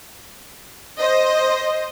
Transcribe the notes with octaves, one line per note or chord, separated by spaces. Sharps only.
C5 D#5